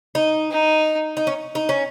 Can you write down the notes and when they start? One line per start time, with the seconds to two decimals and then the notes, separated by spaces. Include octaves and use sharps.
0.15 D#4
0.52 D#4
1.17 D#4
1.27 C#4
1.55 D#4
1.69 C#4